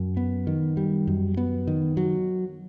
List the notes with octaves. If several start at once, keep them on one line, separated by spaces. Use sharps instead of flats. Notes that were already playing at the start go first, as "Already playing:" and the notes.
Already playing: F#2
B3
D#3
G3
F#2
B3
D#3
F#3